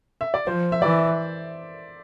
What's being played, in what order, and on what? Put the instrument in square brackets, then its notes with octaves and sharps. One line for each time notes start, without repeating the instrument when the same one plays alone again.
[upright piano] E5
D5
[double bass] F3 [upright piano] C5
[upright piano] E5
[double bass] E3 [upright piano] D5